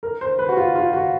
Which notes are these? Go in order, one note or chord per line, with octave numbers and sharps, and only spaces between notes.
A#4
C5
B4
F#4
F4
F4
F#4